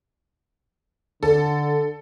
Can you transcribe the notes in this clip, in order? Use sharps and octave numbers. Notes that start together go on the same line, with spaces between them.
D3 A4